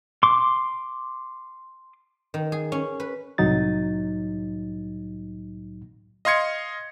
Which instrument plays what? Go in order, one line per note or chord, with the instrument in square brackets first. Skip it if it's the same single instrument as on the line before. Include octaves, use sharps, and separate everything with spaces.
[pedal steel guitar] C6 D6
[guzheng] D#3
G#4
C#4
B4
[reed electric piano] C2 A2 F#3 D#4 A6
[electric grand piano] D#5 F5 C6 G#6 C#7